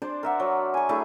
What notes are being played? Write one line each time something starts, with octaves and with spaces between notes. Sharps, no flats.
D4 C5 D5
A#4 E5 F#5
F#3
G#5 C#6
A3 D4 E4 G#4